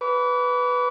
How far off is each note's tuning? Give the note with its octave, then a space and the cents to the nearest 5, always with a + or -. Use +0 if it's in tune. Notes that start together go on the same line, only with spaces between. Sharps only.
B4 +0 D6 -40